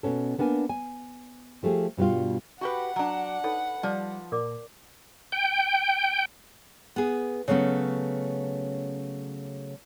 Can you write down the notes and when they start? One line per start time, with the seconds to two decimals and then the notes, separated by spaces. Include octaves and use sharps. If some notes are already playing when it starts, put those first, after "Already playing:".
0.03 B2 B3 C#4 A4
0.38 A#3 B3 D4 A#4 G#5
0.69 G#5
1.63 F3 A3 G4 G#4
1.97 G2 B2 G3 B3 F4
2.61 F#4 G4 B4 F#5
2.96 F#3 D4
3.44 D#4 A4 B4 C#5
3.83 F3 G3 D5
4.32 A#2 A#4 D5 D6
5.32 G5
6.96 B3 G#4
7.48 C#3 F#3 A3 B3 C#4